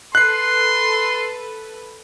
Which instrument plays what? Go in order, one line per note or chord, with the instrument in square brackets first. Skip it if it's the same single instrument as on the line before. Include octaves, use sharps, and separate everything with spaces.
[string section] A4 B4 [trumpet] C6 [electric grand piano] F#6 C7